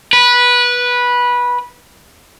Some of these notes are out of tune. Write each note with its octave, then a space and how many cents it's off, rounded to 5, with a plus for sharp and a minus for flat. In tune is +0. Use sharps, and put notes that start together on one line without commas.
B4 -15